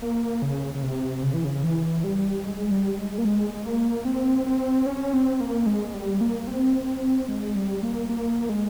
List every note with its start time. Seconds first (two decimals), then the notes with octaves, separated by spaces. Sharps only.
0.02 A#3
0.42 C#3
0.75 C#3
0.83 C3
1.23 C#3
1.34 E3
1.45 C#3
1.64 E3
2.04 G3
2.44 G#3
2.71 G3
2.98 G#3
3.18 A#3
3.25 G#3
3.65 A#3
4.05 C4
4.46 C4
4.86 C#4
5.14 C4
5.41 A#3
5.66 G#3
5.94 G3
6.21 A#3
6.47 C4
7.29 G#3
7.56 G3
7.83 A#3
8.09 A#3
8.49 G#3